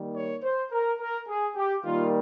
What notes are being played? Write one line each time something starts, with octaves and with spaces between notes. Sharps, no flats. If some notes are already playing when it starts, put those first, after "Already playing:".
Already playing: D#3 G3 A#3
C#5
C5
A#4
A#4
G#4
G4
D#3 G3 A#3 F4